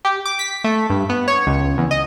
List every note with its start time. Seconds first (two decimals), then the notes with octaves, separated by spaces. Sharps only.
0.05 G4
0.25 D6
0.39 B6
0.64 A3
0.90 G2
1.09 B3
1.28 C#5
1.47 C#2
1.78 E2
1.91 D#5